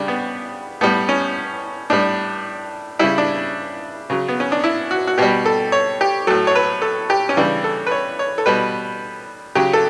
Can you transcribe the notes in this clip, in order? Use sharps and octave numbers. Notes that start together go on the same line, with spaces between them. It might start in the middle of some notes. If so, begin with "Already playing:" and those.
Already playing: C#3 G3 D4 G4
B3
A2 G3 B3
C#4
A2 G3 D4
C#3 G3 E4
D4
C#3 F#3
B3
C#4
D4
E4
F#4
F#4
B2 G3 G4
A4
C#5
G4
A2 F#3 A4
C#5
B4
A4
G4
C#4
C#3 E3 G3 D4
A4
B4
C#5
C#5
A4
B2 G3 B4
C#3 F#3 G4
A4